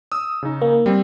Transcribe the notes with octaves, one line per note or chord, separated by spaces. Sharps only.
D#6 E6
C#3 D#4
A#3
G3 C4